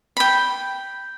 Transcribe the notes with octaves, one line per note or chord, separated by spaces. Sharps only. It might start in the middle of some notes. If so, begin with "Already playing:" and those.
G5 B5